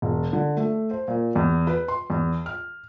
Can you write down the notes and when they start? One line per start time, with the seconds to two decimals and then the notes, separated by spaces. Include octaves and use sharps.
0.02 E1
0.33 D3
0.57 A3
0.91 C5
1.08 A#2
1.36 E2
1.67 B4
1.88 C6
2.10 E2
2.46 F6